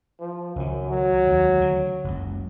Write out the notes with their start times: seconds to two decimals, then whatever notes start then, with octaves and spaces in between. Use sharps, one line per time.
0.20 F3
0.56 C#2 F#2 D#3
0.90 F#3
1.27 D#2 D#3 G#3
1.59 D2 D3
2.04 F#1 C#2